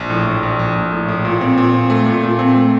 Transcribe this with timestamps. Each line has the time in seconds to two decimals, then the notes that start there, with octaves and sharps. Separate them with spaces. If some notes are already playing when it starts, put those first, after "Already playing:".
Already playing: A#1
0.10 A2
0.26 A#1
0.43 A#1
0.59 A#1
0.75 A#1
0.92 A2
1.08 A2
1.25 A#2
1.41 C4
1.57 A#2
1.74 C4
1.90 A3
2.06 A#2
2.23 A#2
2.39 C4
2.56 A3